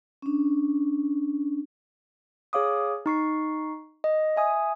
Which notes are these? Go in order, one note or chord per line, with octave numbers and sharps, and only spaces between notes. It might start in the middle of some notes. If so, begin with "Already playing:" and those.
C#4 D4
G#4 C#5 F5 D6 D#6
D#4 C#6 C7
D#5
E5 G#5 D#6